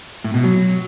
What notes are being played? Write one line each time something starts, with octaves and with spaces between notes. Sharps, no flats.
A2
B2
F#3